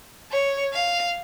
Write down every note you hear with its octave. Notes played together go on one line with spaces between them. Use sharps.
C#5
F5